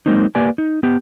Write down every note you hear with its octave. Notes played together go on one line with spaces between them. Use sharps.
F#3 G#3 A#3 C4 D#4
A#3 G4 B4 D5 G#5
D#4
B3 G4